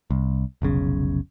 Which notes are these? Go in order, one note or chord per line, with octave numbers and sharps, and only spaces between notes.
C2
F1 B1 C#3